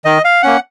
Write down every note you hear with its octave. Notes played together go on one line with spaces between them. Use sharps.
D#3 D#5
F5
A#3 C#4 F#5